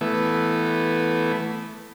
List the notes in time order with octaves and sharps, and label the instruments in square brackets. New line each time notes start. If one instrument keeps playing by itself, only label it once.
[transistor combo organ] E3 A3 B3